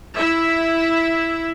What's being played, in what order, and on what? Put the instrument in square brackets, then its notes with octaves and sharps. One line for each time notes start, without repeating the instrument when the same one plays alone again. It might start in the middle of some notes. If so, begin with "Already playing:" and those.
[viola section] E4 E5